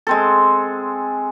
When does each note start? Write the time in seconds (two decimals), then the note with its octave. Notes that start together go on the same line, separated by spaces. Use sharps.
0.07 G#3 C4 A4